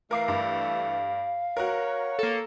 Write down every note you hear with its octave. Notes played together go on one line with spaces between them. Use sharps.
E3 A3 A#4 F5 D6 C7
G2
F#4 A#4 C#5
A#3 A4